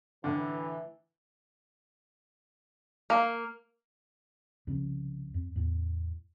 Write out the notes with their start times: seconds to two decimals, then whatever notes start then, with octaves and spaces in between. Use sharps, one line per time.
0.24 A2 D3 E3
3.10 A#3
4.67 C2 C#3 F3 C#4
5.34 F2
5.56 E2 A2